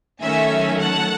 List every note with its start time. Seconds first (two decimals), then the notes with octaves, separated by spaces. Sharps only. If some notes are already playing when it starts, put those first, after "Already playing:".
0.22 D#3 F#3 A3 C#4 E5 G#5
0.80 F#5 A5